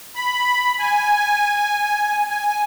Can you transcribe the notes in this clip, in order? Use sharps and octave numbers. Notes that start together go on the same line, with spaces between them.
B5
G#5
G#5